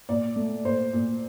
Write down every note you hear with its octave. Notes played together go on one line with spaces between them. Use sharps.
A#2 D5
A3
A#2 C5
A#2